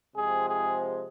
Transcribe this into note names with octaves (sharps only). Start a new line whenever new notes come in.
C3 F3 G#3 C4 G#4
G#4